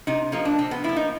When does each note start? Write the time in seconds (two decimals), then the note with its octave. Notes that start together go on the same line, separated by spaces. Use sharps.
0.07 C3 D#4
0.32 F3 A#3 D#4
0.45 D4
0.59 C3 C4
0.71 B3
0.84 F3 A#3 E4
0.96 D#4